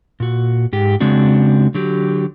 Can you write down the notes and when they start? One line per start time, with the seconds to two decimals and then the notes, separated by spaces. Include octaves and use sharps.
0.20 A#2 F#4
0.73 G#2 G4
1.00 C#3 G#3 C4 D4 F#4
1.75 D3 F#3 G4